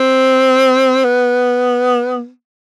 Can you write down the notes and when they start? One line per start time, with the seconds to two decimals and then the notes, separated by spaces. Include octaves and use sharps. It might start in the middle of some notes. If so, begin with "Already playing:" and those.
Already playing: C4
1.04 B3